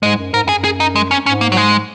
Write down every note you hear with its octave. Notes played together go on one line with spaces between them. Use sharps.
G#2 G#3
F#2
G#2 A#4
F#2
G#4
F#2
G#4
D#4
G#3
C#4
G#2 C#4
A#3
F#3
G#3